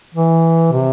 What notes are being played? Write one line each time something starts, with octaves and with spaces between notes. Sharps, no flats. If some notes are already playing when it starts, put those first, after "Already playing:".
E3
C3